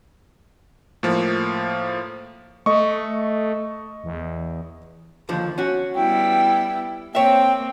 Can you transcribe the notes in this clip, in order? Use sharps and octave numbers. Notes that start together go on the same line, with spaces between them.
A2 F3 A#3
A3 D#5 C#6
E2
D#2 D3 F3
C#4 F#4
G3 B3 E4 G5
A#3 C4 C#5 E5 G5